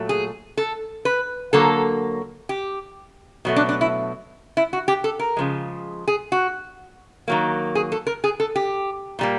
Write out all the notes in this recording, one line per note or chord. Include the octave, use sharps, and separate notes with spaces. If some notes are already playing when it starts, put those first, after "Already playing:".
Already playing: A#2 F#3 A3
G#4
A4
B4
D3 F#3 A#3 A4
G4
B2 F#3 A3
D4
D4
E4
E4
F#4
G4
A4
A#4
C#3 F3 G#3
G#4
F#4
D#3 F#3 A#3
G#4
A4
A#4
G#4
A4
G4
A#2 G3 A#3